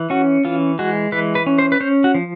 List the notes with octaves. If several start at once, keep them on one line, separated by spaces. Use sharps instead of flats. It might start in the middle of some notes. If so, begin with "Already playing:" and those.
Already playing: E3
C#4 F#4
E3 F4
G#3 F#4
E3 B4
B4
C#4
C5
B4
C#4 C5
F#4
F3